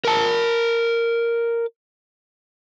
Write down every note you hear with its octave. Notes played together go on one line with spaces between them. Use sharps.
A#4 A5